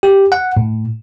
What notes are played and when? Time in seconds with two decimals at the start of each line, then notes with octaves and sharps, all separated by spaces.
0.03 G4
0.32 F#5
0.57 A2